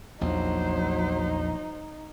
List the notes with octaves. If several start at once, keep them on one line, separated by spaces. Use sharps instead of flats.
A#1 E2 F#3 D#4 C5